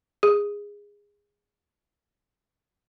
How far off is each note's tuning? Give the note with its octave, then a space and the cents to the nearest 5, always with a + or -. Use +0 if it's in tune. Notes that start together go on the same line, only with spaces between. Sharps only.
G#4 -20